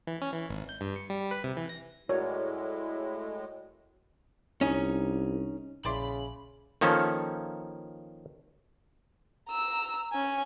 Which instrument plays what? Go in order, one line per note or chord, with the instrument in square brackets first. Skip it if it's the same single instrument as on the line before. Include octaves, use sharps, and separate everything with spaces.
[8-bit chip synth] E3
C#4
E3
G#1
G6
G2
C#7
G3
B4
C3
E3
A#6
[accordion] A2 G#3 [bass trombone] E4 [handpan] F#4 A#4 D5 [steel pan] C#5
[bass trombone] C2 [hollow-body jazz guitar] C#4 D#4
[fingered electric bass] A#1 [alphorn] C#3 [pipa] E4 D5 C6 [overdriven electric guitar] B5
[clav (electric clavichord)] D#3 F3 A#3 C#4 A4
[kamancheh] A#5 E6
C#4 G#5